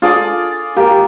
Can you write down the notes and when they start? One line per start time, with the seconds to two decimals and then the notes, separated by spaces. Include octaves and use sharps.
0.02 D4 F4 G#4 A4 D5
0.77 A#3 G4 G5